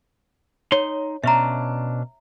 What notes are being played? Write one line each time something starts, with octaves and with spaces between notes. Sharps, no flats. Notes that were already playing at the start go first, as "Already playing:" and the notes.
D#4 C#5 C6
B2 C#4 D4 E5 A#5